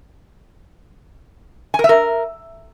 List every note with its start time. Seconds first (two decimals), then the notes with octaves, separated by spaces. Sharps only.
1.74 G#5
1.79 A#4
1.84 E5
1.89 A#4